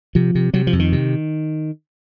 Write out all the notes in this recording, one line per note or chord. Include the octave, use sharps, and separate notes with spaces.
C3 F3
C3
C3 F#3
F3
F2
D#3
C3